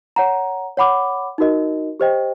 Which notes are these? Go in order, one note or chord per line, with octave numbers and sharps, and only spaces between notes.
C#5 F#5 A#5
C#5 F#5 B5 D6
D#4 F#4 A#4 D#5
G4 C5 D#5 G5